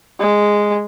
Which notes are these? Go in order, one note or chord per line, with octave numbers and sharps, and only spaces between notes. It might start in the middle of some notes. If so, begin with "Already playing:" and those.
G#3